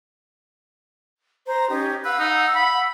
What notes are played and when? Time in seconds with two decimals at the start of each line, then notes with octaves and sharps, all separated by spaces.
1.46 C5 A#5
1.70 C#4 D#4 G4
2.04 B4 F5 F#5 E6
2.19 D#4
2.55 B5